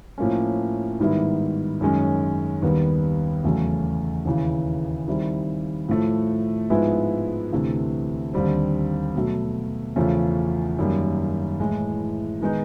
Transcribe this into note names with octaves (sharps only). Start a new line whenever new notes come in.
A2 F3 A#3 C#4
G#2 D#3 G3 B3 E4
F#2 D#3 G#3 C#4
D#2 D#3 G3 B3
E2 C#3 F#3 A3 C#4
D#2 C#3 E3
D#3 G3 C4 E4
A2 F3 A3
G#2 F3 G#3 B3 E4
D2 C3 E3 A3
D#2 D3 G3 C4
B2 F#3 A3
E2 C#3 F3 A3 C#4
F#2 D#3 G3 A#3
A2 E3 G#3
D#3 G#3 B3 D#4